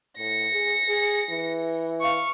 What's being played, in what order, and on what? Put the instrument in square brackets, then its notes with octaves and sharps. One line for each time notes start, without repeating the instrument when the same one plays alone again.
[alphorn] A2 [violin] A#6 C#7
[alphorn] G#4
G#4
E3
[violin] F5 C#6